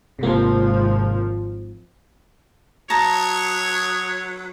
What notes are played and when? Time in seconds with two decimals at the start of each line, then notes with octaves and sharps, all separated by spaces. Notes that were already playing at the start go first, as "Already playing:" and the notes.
0.19 G#1 C3 F3 A#3
2.90 F#3 C#5 A5 A#5 D#6